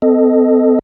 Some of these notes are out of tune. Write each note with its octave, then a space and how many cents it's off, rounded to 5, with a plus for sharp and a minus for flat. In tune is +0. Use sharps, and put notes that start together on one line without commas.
C4 -40 A4 +0 D#5 +0